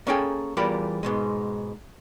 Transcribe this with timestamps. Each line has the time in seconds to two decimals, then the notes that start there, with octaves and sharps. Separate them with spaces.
0.07 A#3 C#4 G#4 A4 G5 G#5
0.57 E2 G3 F4 G4 A#4 B5
1.03 G#2 B2 G#3